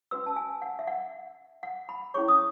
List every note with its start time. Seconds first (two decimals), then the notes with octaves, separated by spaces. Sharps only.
0.11 C#4 F#4 B4 E6
0.26 A5
0.36 G#5
0.62 F#5
0.79 E5
0.87 F#5
1.63 F#5
1.89 B5
2.14 C#4 E4 G#4 C#5 C#6
2.28 D#6